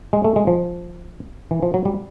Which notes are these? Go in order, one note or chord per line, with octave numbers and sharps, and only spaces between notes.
G#3
A3
G#3
F3
E3
F3
F#3
G3